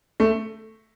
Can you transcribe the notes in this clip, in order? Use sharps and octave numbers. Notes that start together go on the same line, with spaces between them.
A3